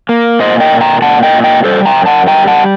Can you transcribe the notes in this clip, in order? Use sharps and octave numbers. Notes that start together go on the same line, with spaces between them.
A#3
A#2 C5 D#5
D#5 G5
A#2
G5 A#5
A#2 F#5 A5
D#5 G5
A#2
D#5 G5
G3 A4 C5
G5 A#5
F#2
F#5 A5
G3 G5 A#5
F#5 A5